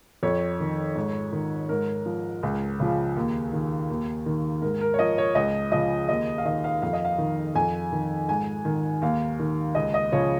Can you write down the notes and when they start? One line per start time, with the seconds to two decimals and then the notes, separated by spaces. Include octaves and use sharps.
0.23 F2 C#5
0.60 D#3
0.95 G#2
1.32 D#3
1.69 G#2 A#4
2.06 F3
2.43 C#2
2.80 C#3 F3
3.16 D#2
3.53 D#3
3.90 D#2
4.26 D#3
4.62 G#2 A#4
4.81 A#4
4.94 C#5
4.99 F3 D#5
5.18 C#5
5.35 C#2 D#5
5.72 C#3 F3 D#5
6.09 D#2 D#5
6.38 F5
6.45 D#3 D#5
6.64 F5
6.82 F2 F5
6.93 D#5
7.05 F5
7.18 D#3
7.55 F2 G#5
7.92 D#3
8.29 G#2 G#5
8.65 D#3
9.02 D#2 F5
9.39 D#3
9.75 C#2 D#5
9.94 D#5
10.12 C#3 F3 C#5